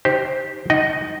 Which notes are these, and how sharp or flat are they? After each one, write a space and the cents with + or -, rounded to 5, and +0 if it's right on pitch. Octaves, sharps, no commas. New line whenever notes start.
D#4 +0 G4 +0 C5 +0
D#4 +0 D#5 +0 F#5 +30